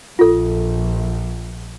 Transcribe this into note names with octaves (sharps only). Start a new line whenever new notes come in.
A#1 F4 A4